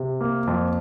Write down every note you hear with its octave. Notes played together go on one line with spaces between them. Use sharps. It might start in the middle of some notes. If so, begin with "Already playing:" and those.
Already playing: C3
A#3
F2